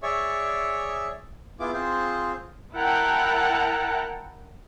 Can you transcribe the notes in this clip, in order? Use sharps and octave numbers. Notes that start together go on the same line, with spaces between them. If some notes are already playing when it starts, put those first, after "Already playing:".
G#4 C#5 D5 E5 C#6
B3 E4 F4 G#4 D6
C4 F4 G#4 C5
E4 A#4 F#5 G5 A5 A#5